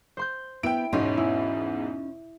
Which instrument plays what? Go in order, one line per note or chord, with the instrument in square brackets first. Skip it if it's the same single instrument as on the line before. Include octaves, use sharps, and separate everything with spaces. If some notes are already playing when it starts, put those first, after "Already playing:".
[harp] C5 C6 G6
[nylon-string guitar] B3 [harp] E4 [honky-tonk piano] G5 D7
[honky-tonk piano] E2 G#2 B2 [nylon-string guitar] C#4 D#4 C#5 [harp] C6
[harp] E4